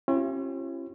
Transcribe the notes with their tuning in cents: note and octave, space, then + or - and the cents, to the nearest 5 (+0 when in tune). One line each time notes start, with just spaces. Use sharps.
C#4 -40 E4 +40 G4 -35